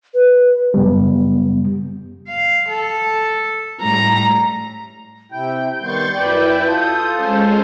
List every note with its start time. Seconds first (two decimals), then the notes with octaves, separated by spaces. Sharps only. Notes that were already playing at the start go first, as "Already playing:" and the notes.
0.14 B4
0.74 F#2 C#3 G3 B3
2.28 F5
2.69 A4
3.81 A2 G3 A#5
5.32 C3 E4 G5 G6
5.81 D#3 G3 B3 C6 C#6 A6
6.13 F#2 E4 B4 D5 G5
6.65 F4 A4 D#6
7.15 G#3 C#4 C5